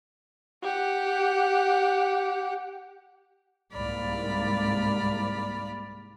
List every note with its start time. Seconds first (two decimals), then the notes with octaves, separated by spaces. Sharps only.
0.63 G4 F#5
3.73 C2 G#2 A#3 D5 B5 F6